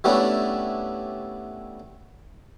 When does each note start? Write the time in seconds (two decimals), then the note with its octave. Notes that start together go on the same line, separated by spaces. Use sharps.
0.04 G3 A3 B3 C#4 D4 E4